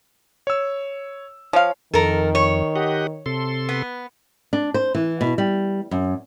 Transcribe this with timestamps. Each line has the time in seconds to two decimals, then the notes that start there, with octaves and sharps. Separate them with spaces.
0.47 C#5 E6
1.53 F3 C#5 F5
1.94 F2 D#3 A4 A#4
2.35 C#5
2.76 G4 D#5 F#5
3.26 C3 A4 C6
3.69 B3
4.53 D4
4.74 C5
4.95 E3
5.21 B2
5.38 G3
5.91 F#2